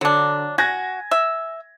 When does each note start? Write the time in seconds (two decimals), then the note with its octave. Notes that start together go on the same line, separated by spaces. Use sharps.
0.01 D3 F#3 D4
0.58 F#4 G#5 G#6 A#6
1.11 E5